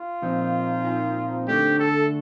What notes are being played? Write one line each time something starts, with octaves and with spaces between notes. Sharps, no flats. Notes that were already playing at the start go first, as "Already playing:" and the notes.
Already playing: F4
A#2 F3 C4 D#4
A#2 F3 C4 D#4
D3 A3 D4 G4
A4